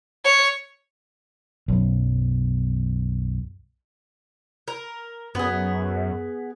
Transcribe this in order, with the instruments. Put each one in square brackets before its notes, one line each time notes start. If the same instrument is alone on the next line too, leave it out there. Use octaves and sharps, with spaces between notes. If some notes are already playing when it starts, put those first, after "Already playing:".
[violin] C#5
[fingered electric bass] B1 F#2
[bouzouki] A#4
[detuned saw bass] F#2 [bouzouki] B3 G#4